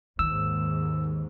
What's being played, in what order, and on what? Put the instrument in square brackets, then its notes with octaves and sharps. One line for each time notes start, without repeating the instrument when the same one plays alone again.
[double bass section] D#2 G#2 [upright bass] D#3 [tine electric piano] E6